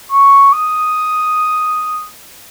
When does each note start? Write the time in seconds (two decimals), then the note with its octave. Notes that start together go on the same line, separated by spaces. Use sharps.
0.12 C#6
0.53 D#6